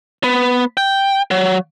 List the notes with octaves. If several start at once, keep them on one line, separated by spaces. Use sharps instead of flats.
B3
G5
F#3